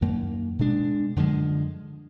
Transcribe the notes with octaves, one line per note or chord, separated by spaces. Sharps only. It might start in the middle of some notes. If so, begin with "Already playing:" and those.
F#2 D#3 A#3
B2 G#3 D4
F#2 D3 F3 G#3